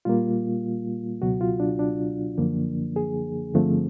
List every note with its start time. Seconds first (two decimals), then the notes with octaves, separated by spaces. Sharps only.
0.05 A#2 G3 A#3 F4
1.22 C#2 B2 F#3 F#4
1.41 F4
1.60 D4
1.79 D4
2.38 F#2 D3 F3 A#3
2.96 G#4
3.54 G2 D3 F3 A3 C4